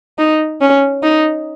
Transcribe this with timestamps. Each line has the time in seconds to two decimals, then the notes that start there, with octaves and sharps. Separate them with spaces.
0.18 D#4
0.61 C#4
1.03 D#4